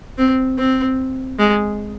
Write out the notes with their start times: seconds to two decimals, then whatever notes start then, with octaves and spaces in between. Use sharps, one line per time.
0.18 C4
0.58 C4
1.39 G#3